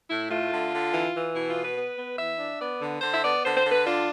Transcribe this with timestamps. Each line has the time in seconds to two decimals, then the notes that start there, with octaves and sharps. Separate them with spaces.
0.09 A2 E4
0.29 A3 F4
0.50 D3
0.72 D3
0.93 E3
1.13 E3
1.34 B2 E4
1.48 F4
1.55 B3
1.62 B4
1.76 B3
1.97 B3
2.18 E3 E5
2.38 D4
2.59 B3 D5
2.81 D3
3.01 D3 C5
3.12 E5
3.22 B3 D5
3.43 D3 C5
3.56 C5
3.64 D3
3.71 B4
3.85 D4 F4